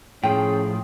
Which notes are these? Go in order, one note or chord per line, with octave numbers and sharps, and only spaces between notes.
A2 F3 C#4 G#4 G5